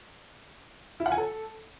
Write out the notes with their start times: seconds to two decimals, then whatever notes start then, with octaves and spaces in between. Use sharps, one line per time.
1.00 E4
1.06 F#5
1.12 G#5
1.18 A4